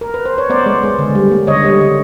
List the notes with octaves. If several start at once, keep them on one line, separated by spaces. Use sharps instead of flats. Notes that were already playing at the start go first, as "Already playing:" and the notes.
A#4
B4
C5
C#5
B3 C5 D5
G#3
G#3
D3
G3
A#3
D3 C#5 D#5
G3
D3